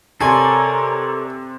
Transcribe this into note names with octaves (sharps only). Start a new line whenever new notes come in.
C3 A4 A#4 C#5 D5 G#5 C6